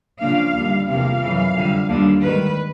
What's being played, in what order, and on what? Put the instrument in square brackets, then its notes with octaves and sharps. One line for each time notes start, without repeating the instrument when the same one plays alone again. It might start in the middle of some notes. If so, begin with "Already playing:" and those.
[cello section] C#3 F3 A#3 D4 F5
D#2 D3 G3
E2 C3 F3 A#3 F5
F#2 C#3 E3
F2 D3 G3
D#2 D3 G3 A#3 D4
G#2 D#3 G3 B4